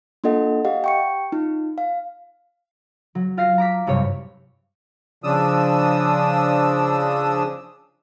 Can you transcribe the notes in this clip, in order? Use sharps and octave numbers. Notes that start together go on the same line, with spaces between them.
A#3 D4 F4 A4 D#5 F#5
G4 D#5 F5 F#5
G5 C#6 C#7
D#4 F4
F5
F#3
F4 F5 A#6 C7
A#5 D6 B6
F#1 G2 C3 C#5
C#3 F3 D4 D#6 E6